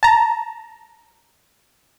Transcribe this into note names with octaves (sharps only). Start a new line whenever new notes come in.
A5 A#5